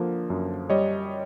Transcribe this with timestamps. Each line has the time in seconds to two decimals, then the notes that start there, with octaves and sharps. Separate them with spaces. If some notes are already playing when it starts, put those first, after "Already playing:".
Already playing: D3 F3 A#3
0.30 F#2
0.70 G3 C#5 D#5